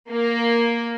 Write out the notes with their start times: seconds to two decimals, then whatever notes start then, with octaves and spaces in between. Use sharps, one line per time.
0.10 A#3